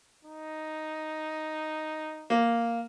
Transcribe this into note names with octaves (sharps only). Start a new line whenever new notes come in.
D#4
A#3